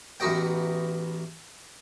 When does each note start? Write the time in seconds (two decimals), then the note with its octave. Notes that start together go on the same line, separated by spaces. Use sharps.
0.20 A1 E2 D#4 F#4 D#5 G5